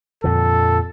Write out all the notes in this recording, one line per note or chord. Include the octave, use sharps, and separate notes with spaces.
F2 A#2 D3 A4